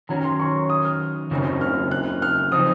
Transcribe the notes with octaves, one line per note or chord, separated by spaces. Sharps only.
D#3 F#3 C#4 A#5
C6
C#6
D#6
F6
C#3 F#3 C4 D#4
F6
F#6
F6
F3 C4 D#4 D#6